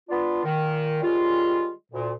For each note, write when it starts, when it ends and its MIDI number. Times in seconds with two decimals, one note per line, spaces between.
0.09 0.43 59
0.09 0.43 62
0.09 0.43 65
0.44 0.98 46
0.44 0.98 51
1.02 1.69 51
1.02 1.69 55
1.02 1.69 56
1.02 1.69 61
1.02 1.69 65
1.92 2.11 38
1.92 2.11 46